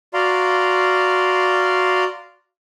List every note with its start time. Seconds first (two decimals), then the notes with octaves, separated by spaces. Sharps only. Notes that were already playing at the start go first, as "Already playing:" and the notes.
0.14 F#4 D5 F5 A#5 C6